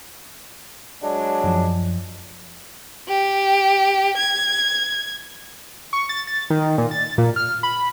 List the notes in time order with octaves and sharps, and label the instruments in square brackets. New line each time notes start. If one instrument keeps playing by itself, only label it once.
[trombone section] F#3 G#3 D4
[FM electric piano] F#2 F3
[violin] G4
G#6
[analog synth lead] C#6
A6
A6
D#3
A#2
A6
A#2
F6
B5